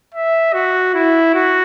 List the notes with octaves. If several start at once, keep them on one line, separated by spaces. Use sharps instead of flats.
E5
F#4
E4
F#4